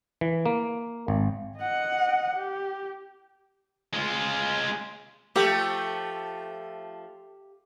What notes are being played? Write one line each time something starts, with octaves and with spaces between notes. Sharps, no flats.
E3
A#3
G#1
D#5 F#5
G4
G#3 F4
F3 A3 G4